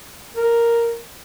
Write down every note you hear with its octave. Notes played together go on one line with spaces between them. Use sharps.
A#4